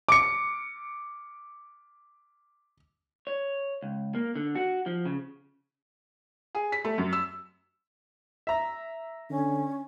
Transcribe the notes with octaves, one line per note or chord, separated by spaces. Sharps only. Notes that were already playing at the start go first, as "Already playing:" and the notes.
D6 C#7
C#5
C#2
A#3
D3
F#4
F3
C#3
G#4
B6
A3
F#2
E6
E5 A#5
D3 C#4